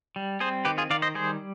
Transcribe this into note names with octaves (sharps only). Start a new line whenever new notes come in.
G3
C4 G#4 C5
D#3 G4 B4
F4 G#4
D#3 D5 F5
C5 D#5
G3 G#4 C5